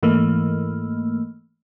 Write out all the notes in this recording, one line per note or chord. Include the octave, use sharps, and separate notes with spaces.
G#2 E3 A3 A#3